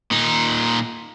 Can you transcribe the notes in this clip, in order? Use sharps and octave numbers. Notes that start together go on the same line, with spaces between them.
A#2 D#4